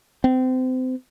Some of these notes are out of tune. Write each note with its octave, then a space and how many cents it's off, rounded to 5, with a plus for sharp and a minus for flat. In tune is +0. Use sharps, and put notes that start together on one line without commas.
C4 -30